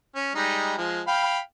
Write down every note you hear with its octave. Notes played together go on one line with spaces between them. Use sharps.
C#4
G3 G#3 D#4
F3 G#3
F5 G5 B5